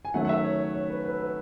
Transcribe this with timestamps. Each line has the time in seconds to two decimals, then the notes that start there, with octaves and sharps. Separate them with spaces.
0.05 G#5
0.14 D#3 F#3 A3 C#4 F#5
0.25 F#5
0.29 E5
0.44 C#5
0.59 C#5
0.74 C#5
0.90 B4
1.05 B4
1.20 B4